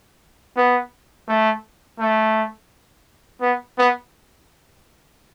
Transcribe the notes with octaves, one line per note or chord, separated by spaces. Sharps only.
B3
A3
A3
B3
B3